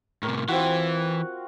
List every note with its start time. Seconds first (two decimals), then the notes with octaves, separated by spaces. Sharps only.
0.23 A2 C3 A#4
0.49 E3 C4 F4 F#4